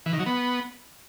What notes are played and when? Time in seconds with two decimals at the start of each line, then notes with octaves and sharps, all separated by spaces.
0.06 E3
0.13 D#3
0.19 F#3
0.26 B3